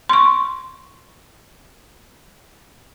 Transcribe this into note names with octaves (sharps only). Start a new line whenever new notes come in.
C6 C#6